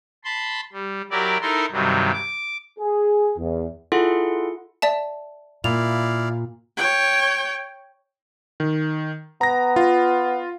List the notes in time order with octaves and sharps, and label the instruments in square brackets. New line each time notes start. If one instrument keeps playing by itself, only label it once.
[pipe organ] A5 B5 C6
G3
F#3 E4 G4 A#4 D5
D#4 E4 A4 A#4 C6
G2 C3 D#3 F#3 G3
D6
[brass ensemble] G#4
E2
[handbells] E4 F4 G#4 A4 F#5 C6
[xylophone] D5 E5 A5
[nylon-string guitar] A#2 [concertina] E4 D5 F5 [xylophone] F7
[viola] C#5 G5
[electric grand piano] D#3
[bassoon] B3 [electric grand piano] A#5 A#6
[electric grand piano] F4